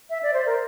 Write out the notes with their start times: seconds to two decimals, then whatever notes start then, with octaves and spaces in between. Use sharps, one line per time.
0.10 E5
0.23 D5
0.34 C5
0.46 A#4